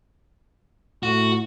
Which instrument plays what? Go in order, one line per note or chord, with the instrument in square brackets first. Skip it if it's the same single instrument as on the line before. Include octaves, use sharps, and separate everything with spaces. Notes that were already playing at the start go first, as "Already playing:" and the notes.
[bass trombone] A2 [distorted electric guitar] F#4